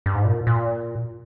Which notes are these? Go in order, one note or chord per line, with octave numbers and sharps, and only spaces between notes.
G2
G#2
A#2
A#2